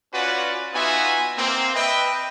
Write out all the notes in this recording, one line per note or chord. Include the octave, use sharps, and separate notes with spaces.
C#4 F4 F#4 B4 D5 F#5
B3 D#4 F4 F#4 E5 G#5
A#3 C4
B4 D#5 E5 G5